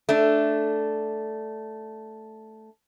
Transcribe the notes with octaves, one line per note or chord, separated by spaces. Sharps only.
A3 D4